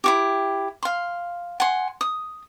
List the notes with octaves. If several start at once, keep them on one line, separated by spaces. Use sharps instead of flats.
E4 F#4 G4
F5 C6
F#5 G#5 C6
D#6